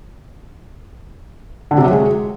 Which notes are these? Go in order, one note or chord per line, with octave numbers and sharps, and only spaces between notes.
D3
C3
F#3
G#3